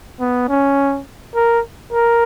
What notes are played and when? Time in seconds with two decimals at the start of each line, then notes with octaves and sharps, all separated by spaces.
0.20 B3
0.49 C#4
1.35 A#4
1.93 A#4